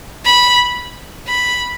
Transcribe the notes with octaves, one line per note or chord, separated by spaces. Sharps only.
B5
B5